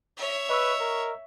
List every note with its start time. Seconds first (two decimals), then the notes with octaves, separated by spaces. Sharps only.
0.17 C#5 E5
0.49 B4 D#5 C#6 E6
0.80 A#4